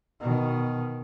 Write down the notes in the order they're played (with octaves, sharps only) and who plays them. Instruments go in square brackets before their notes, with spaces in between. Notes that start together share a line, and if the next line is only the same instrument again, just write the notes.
[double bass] B2 D#3